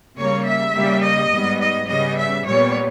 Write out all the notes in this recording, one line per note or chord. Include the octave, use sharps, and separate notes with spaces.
C#3 G3 A#3 C#5
E5
C#3 G3 A#3
D#5
G#2 G3 B3
D#5
C#3 G3 B3 D#5
E5
A#2 G3 B3 C#5